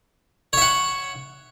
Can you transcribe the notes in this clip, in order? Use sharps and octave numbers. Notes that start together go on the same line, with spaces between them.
C#5 E5 F#5